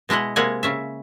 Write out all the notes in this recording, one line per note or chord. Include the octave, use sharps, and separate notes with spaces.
B2 G#3 E4 D#5 F#5
C3 G#3 A#3 E4 F#5 G#5
C#3 C#4 E5